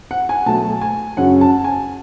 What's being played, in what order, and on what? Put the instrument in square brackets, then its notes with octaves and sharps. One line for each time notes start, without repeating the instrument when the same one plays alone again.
[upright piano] F#5
G#5
B2 F#3 A3 A5
G#5
F#2 C#3 F#3 C#4 F#5
A5
G#5